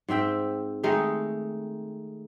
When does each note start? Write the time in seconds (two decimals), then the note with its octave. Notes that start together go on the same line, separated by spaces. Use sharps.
0.09 G#2 C4 E5 G5
0.83 D#3 G#3 A3 D#4